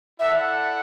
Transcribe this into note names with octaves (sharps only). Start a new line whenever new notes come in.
E4 A4 D5 E5 F#5